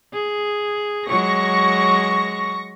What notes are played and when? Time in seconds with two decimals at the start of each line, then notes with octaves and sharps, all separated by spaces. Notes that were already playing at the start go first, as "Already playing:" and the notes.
0.13 G#4
1.07 F#3 G#3 C#6 A#6